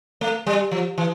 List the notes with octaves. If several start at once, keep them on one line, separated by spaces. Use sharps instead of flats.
A3
G3
F3
E3